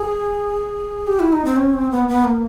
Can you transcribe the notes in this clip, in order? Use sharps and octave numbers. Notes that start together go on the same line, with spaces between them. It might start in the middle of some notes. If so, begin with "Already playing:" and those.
Already playing: G#4
G4
E4
D#4
C4
C#4
C4
B3
B3
A#3